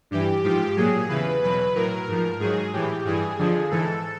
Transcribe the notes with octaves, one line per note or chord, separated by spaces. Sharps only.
G2 E3 G4
G#2 F3 G4
A#2 F#3 G#4
E2 C#3 E3 B4
E2 B2 F#3 B4
A2 F#3 A#4
G#2 F3
G#2 D#3 F#3 G#4
A2 E3 G4
G2 E3 G#4
F2 D3 F3
G#2 E3 A4